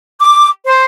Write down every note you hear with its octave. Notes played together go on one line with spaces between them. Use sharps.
D6
C5